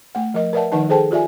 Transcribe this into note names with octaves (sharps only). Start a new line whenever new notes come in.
A3 F#5
F3 A#4 D#5
A#4 B4 D5 E5 F#5 A5
D#3 F3 D#4 B4 F#5 A5
G#4 A4 C5 G5 A5
F4 G4 D5 E5 G#5